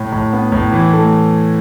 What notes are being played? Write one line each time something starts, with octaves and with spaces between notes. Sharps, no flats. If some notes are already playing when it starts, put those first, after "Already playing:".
Already playing: A2
A2
B3
A2
E3
A3